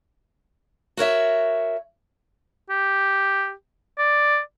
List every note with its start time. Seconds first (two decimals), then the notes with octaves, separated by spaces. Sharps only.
0.97 F#4 A#4 C#5 E5
2.69 G4
3.98 D5